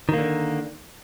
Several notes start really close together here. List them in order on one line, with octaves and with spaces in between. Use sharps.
D#3 A#3 D3